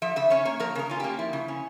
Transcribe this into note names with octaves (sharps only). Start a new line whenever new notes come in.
F3 E5
C#3 E5
C#4 C#5
A#3 C#5
F3 A#4
C#3 A#4
C#4 F4
A#3 G4
F3 E4
C#3
C#4